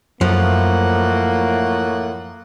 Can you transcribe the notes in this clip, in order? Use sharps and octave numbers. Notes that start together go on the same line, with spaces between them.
F#2 A2 F3 A3 A#3 F#5